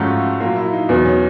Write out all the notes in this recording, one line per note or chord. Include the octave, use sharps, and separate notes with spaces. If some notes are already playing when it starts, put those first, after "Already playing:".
Already playing: G#2 F3 A3 C#4 F4 F#4 A4
A#2 F#3 A#3 F4
E4
D#4
E2 B2 F#3 B3
C#4